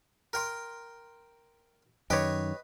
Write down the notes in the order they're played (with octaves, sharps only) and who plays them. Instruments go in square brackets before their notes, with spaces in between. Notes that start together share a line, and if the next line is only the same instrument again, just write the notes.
[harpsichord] A#4 G5 C6
[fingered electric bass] F#2 D#3 [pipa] G4 C#5 [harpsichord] B4 D#5